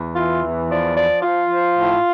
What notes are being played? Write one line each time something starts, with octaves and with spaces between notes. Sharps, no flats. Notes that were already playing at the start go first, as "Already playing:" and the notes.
Already playing: E2
E3 F4
E2
F3 D5
F3 D5
F3 F4
F3
A2